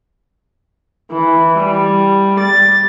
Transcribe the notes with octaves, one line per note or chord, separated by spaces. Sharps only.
E3
G3
A6